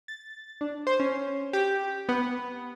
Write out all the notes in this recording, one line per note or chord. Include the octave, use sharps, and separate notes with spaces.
A6
D4
C5
C#4
G4
B3